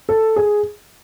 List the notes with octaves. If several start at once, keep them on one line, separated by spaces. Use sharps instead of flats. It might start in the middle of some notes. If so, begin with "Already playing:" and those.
A4
G#4